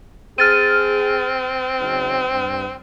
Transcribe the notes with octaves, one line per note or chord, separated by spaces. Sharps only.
C4 G#4 F6 A6 D#7
C#3 F#3 D#4
G2